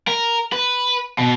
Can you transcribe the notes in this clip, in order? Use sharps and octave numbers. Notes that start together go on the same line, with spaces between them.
A#4
B4
B2